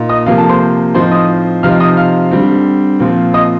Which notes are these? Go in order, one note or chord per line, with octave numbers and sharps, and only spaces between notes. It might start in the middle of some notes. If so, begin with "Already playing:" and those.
Already playing: A#2 D#4
D#5 D#6
C3 F3 A#3 F4 F5
A4 A5
C5 C6
A2 F3 C4 D#4 C5 C6
D#5 D#6
C3 F3 C4 D#4 F5 F6
D#5 D#6
F5 F6
D3 G3 C4
A#2 F3 C4
D#5 D#6